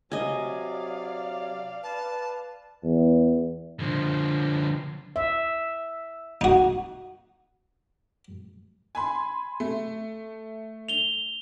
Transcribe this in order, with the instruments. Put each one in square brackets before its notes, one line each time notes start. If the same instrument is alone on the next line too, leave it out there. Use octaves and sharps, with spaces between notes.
[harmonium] C3 F#3 [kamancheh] D5 F5 [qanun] D#5 G#5
[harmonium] B4 [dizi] A5
[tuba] E2
[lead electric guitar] D3 F3
[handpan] E5
[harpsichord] D#4 F#4
[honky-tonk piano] G#5 B5 C6
A3
[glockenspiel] F7 G7